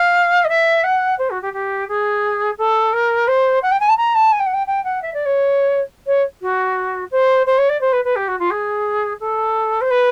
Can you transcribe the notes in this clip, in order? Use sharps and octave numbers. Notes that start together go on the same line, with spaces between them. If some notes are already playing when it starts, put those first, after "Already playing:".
Already playing: F5
D#5
E5
F#5
C5
F#4
G4
G4
G#4
A4
A#4
C5
F#5
G5
G#5
A5
A#5
A5
G#5
G5
F#5
G5
G5
F#5
E5
D5
C#5
C#5
F#4
C5
C5
C#5
D5
C5
B4
B4
G4
F#4
F4
G#4
A4
C5
B4